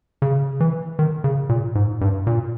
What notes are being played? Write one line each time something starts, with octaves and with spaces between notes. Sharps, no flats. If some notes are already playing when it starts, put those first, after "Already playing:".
C#3
E3
D#3
C#3
A#2
G#2
G2
A#2